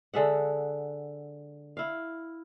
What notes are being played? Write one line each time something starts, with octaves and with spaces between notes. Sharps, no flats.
D3 G#3 E5 F#5
E4 F5